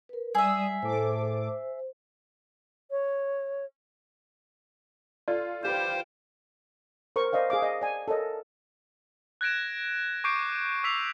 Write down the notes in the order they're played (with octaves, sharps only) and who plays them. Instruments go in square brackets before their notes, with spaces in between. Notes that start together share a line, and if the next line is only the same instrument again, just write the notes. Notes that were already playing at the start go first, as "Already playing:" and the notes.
[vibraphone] A#4 B4
[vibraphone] G3 D5 G#5 [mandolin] G#4 E5 [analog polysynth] D#6 E6
[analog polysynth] A2 A4 D6 [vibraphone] C5
[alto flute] C#5
[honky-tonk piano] F4 A4 [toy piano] D5
[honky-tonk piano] F4 G4 B4 [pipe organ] C5 [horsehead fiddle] F5 G5
[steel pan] A#4 C5 C#6
C5 D5 D#5 F5 G5
G#4 F5 D6
D#5
D5 G#5
A4 A#4 C#5 D#5
[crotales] F#6 G#6 A#6 D7 E7
C#6 D6 G6 C7 D7
D6 E6 B6 C7 F7